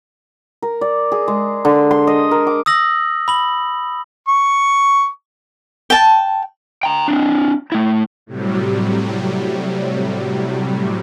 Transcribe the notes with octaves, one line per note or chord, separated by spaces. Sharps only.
A#4
D5
G#4
G#3
D3
C6
D#5
A#4
D6
D#6 E6 A#6 F#7
B5 F#7
C#6
G5 A5
G5 A#5
C4 D4
A3 E4
A2 C3 F#3 G3